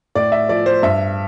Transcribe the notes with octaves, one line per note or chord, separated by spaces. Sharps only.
A2 D5
E5
F3 D5
C5
G2 E5